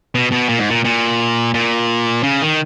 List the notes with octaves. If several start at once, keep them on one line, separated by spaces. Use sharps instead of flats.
B2
B2
A#2
G#2
A#2
A#2
A#2
C#3
D#3